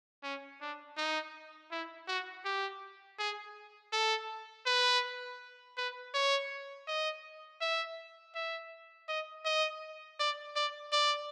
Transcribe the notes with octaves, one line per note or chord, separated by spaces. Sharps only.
C#4
D4
D#4
E4
F#4
G4
G#4
A4
B4
B4
C#5
D#5
E5
E5
D#5
D#5
D5
D5
D5